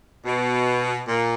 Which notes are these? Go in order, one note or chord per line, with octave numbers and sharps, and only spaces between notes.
B2
A#2